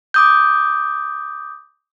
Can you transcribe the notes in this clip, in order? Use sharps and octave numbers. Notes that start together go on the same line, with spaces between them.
D6 D#6 G6